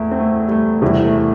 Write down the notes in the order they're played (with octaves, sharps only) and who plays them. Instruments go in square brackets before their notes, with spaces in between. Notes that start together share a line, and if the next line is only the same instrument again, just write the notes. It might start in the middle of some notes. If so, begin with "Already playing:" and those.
Already playing: [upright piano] E2 E4 [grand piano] A3
[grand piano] C4
A3
G3
A3
[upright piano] E2 C3 G3 E4 [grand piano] A3
[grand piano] A3